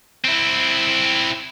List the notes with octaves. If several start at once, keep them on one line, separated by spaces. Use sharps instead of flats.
C4 E4